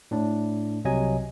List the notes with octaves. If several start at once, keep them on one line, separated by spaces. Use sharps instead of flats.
A2 D4
C2 C3 F#3 D#5 G#5